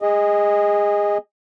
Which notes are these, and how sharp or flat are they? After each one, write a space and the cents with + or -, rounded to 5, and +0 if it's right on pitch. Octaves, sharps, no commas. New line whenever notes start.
G#4 -25 D#5 +0